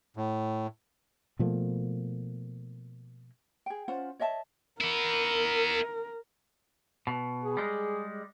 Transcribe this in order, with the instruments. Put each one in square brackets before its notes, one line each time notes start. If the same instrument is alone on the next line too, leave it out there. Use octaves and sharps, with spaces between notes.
[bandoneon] A2
[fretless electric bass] B2 F3 A3 A#3
[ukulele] G#4 G5
C#4 F4 C5 F#5
C#5 D#5 E5 A5
[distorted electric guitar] B3 E4 [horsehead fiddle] A#4
[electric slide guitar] B2
[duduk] G#4
[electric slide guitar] G3 G#3